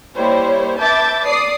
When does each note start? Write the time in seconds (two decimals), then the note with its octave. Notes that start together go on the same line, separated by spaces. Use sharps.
0.17 G3 A#3 E4 C5 C#5
0.80 B4 E5 A5 D6 G6 A6
1.26 D5 D6 D#6 C7